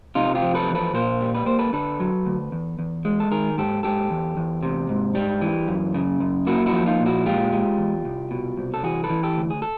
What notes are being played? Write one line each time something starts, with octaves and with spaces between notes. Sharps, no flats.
C3 D#4 F4
F4 G4
F3
A4 B4
E2
A4 B4
A#2 A#4 C5
G3
B4
A#3 C5
A4 B4
D3 A4 B4
F#3
D2
E2
E2
G#3
A4
D#3 G#4 A#4
G#2 G4 A4
G#2 G4 A4
E2
E2
C3
G#2
G3
E3
F#2
C#3
F#2
A#3 E4 F#4
E4 F#4
F3
D#4 F4
A#2
E4 F#4
G#3 F4 G4
G#3
E2
C2
B2
C2
A4
E3 F#4 G#4
A4 B4
E3
G4 A4
D2
G#4
A4